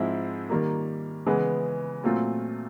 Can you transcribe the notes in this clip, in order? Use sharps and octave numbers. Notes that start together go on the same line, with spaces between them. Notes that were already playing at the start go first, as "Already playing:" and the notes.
Already playing: G#2 F3 G#3 C4 E4
D#3 G3 A#3
C#3 E3 G#3 B3
A#2 F#3 A3 C4 F4